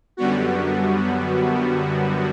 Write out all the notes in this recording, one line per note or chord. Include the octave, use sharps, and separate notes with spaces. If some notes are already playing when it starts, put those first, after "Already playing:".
F#2 D3 G3 B3 F#4